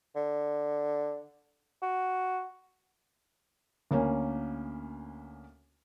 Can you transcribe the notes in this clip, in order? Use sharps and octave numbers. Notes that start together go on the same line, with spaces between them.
D3
F#4
D2 A#3 C#4